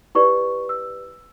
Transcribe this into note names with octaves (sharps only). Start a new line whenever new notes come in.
E4 G4 B4 D5 C#6
E6